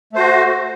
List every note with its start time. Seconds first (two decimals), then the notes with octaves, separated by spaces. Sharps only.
0.13 A3
0.16 C5
0.18 F#4